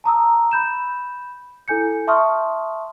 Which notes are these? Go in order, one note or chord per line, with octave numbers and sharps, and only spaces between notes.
A5 A#5 D#6 E6
B5 G6 E7
E4 A4 G#5 G6 C#7
E5 A5 C6 C#6 D#6 F6